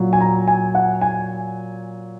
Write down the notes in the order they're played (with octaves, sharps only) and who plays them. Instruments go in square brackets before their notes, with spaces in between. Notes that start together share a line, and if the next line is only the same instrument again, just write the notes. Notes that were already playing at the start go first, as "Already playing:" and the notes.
Already playing: [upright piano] A#2 F#3
G#5
A#5
G#5
F#5
G#5